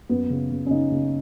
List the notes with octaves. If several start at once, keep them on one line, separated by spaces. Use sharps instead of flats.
F#2 B3
C#3
C#3
C#4
C#3 D#4
C#3